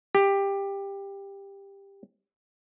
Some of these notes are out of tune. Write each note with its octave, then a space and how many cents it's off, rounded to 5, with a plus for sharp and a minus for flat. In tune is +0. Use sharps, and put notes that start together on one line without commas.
G4 +15